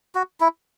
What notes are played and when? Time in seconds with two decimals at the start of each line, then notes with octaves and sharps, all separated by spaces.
0.15 F#4
0.40 E4